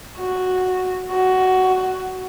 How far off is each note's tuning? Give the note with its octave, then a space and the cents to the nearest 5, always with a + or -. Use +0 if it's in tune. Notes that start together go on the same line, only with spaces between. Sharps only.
F#4 -5
F#4 +10